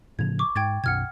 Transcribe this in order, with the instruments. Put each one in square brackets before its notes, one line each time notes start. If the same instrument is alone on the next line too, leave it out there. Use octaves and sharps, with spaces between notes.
[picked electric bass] A2 C#3 F3 [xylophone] G#6 F7
[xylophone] C#6 D6
[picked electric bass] G#2 [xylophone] G5 G#6 A6
[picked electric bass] B1 F#2 B2 [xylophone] F#5 F6 G#6